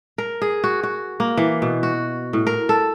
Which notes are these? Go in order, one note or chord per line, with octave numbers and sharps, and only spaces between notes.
A#4
G#4
F#4
F#4
A#3
E3
B2
F#4
A2
A#4
A4